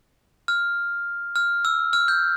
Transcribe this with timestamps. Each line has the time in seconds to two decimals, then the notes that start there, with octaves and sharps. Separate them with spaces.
0.48 F6
1.36 F6
1.65 E6
1.93 F6
2.08 G6